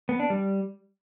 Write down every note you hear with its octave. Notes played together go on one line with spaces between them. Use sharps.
B3
D4
G3